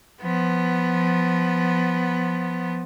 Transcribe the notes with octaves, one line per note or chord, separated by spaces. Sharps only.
F3 B3